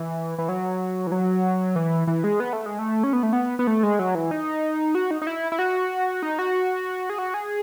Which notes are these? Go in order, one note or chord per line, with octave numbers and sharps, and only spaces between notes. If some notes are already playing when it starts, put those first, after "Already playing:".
Already playing: E3
E3
F#3
E3
F#3
E3
E3
G#3
B3
A3
G#3
A3
C#4
B3
A3
B3
B3
A3
G#3
F#3
E3
D#4
F#4
D#4
D#4
E4
E4
F#4
D#4
F#4
G#4
F#4
G#4